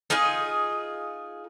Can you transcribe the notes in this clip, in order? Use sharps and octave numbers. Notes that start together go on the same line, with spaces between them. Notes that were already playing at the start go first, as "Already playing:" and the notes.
D#4 F4 G#4 G#5